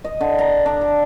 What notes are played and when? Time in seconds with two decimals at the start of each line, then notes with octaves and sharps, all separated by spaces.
0.04 D#5
0.21 D3
0.39 A#5
0.66 D4
0.81 A4